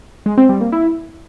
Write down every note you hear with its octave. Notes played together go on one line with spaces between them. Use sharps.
G#3
C4
G3
A#3
E4